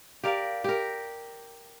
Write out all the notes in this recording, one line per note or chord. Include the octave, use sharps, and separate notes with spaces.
G4 A#4 D5 F5
G4 A#4